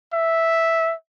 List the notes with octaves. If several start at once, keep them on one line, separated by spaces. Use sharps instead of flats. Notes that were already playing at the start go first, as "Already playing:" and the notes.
E5